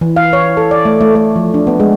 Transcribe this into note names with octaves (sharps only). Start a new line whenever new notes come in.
E3
F5
C#5
A4
D5
A3
A3
A3
F3
D4
B3
G#3